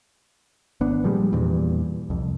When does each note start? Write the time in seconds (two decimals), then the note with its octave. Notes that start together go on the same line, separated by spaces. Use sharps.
0.81 G#1 B3 D4
1.04 A#2 F3 G3 G#3
1.33 E2 G2 A#2 E3
2.10 C2 F2